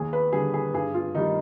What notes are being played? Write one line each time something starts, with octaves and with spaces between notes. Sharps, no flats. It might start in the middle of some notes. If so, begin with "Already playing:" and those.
Already playing: D#2 G#4
B4
D3 G3 G#4
G#4
G2 G#4
F4
D#3 G3 D#4